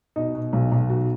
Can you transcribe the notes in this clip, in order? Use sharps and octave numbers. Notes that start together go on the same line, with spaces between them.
B2 D#4
B2
B1
B1
B2 F#4